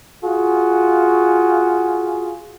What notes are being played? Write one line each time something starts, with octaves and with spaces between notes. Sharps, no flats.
F4 F#4 G#4